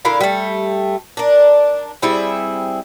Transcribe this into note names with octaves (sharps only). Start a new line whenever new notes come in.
D3 E4 A#4 F5
G3 A3
D4 A#4
G3 C4 E4 G#4